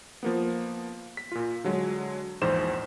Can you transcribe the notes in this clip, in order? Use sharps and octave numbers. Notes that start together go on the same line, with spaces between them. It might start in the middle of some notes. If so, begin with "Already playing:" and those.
F3 A#3 B3
B6
A#2 F4
D3 F#3 G#3
A#1 E2 G#2 C5 E7